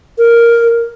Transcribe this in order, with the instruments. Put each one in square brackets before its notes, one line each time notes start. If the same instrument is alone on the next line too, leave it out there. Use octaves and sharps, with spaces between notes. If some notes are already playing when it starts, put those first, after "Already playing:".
[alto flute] A#4